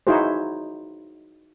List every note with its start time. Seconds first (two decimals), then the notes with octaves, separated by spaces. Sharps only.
0.07 D#4 E4 F#4 G#4 C5